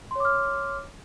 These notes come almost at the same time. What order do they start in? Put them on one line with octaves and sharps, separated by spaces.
C6 C#5 D6 F6